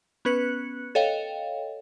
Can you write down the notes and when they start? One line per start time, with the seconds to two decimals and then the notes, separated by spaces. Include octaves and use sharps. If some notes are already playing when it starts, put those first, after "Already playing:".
0.25 B3 C#4 B4 F#6 C#7
0.95 A4 C#5 D#5 F5 G5